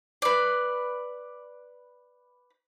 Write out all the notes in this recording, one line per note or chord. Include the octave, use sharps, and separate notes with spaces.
B4 D5